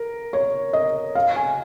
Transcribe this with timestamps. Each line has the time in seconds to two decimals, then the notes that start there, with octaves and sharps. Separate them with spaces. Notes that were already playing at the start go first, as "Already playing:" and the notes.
Already playing: A#4
0.33 C#5
0.73 D#5
1.15 F5
1.36 G#5